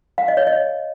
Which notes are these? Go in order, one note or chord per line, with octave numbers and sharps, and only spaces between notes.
F5
D#5
C#5
D#5